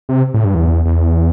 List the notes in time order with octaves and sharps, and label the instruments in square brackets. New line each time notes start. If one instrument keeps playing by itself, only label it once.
[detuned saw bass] C3
A2
G2
E2
E2